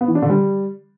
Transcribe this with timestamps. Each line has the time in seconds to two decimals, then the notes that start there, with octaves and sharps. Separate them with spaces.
0.01 B3
0.08 E3
0.15 D4
0.22 D3
0.29 G3